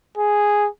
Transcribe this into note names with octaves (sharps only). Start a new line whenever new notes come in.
G#4